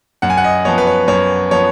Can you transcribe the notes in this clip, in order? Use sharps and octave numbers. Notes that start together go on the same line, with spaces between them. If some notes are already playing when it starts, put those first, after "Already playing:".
F#2 F#5
G#5
F#5
D#5
F3 B3 C#5
B4
C#5
F#2 C#5
F3 B3 C#5